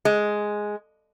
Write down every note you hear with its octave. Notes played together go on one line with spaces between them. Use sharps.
G#3